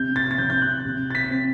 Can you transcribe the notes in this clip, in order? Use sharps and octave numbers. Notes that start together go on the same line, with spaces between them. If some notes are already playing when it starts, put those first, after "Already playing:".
Already playing: C3 G6
A6
A6
C3 G6
G6
F#6
C3
A6
B6
C4